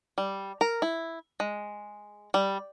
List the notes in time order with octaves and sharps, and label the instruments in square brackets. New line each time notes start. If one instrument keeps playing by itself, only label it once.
[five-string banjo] G3
A#4
E4
G#3
G3